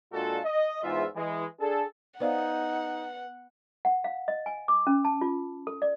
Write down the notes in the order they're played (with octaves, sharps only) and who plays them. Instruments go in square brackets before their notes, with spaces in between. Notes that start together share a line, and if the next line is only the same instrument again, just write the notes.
[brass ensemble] A#2 G#3 D4 F4 F#4 A4
D#5
E2 G#2 F4 E5
E3 G#3
D4 G#4 A4
[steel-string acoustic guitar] B3 [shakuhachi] D#4 [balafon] C5 D5 F5 [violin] F#5
[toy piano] F#5
F5
D#5
G#5
D6
C#4
A5
F4
A4
D5